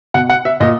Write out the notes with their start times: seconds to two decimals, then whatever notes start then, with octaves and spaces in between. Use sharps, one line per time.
0.14 B2 F#5
0.29 F#5
0.45 E5
0.60 A#2 D#5